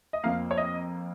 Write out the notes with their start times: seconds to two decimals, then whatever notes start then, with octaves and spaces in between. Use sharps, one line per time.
0.13 D#5
0.23 F2 F3 A#3 F5
0.51 C#5
0.57 D#5